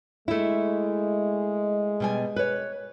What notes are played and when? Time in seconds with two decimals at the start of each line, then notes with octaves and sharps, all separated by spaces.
0.28 G#3 A3 E4
2.00 B2 G3 G#5
2.36 B4 C#5